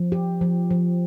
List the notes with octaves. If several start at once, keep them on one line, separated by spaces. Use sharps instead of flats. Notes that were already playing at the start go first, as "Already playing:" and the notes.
Already playing: F3
G4
F3
F3